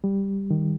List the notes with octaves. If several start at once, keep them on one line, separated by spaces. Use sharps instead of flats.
G3
D#3